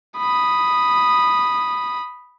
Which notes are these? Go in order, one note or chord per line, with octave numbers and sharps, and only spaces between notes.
B5 D#6